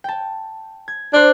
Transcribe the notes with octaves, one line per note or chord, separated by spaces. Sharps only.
G5 A5
G#6
D4 C5 D6